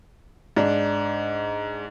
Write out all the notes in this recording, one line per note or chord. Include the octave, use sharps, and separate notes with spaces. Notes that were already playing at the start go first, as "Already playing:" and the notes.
G#2 D4